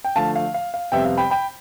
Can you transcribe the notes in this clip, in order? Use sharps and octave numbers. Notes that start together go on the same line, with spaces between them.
G5
D3 F3 A3 F5 A5
F5
F5
F5
F2 C3 G3 B3 E5 G5
F5
G5 B5
G5 B5